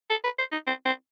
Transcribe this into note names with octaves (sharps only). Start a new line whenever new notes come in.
A4
B4
C5
D#4
C4
C4